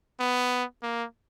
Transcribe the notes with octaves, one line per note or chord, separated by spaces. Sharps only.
B3
A#3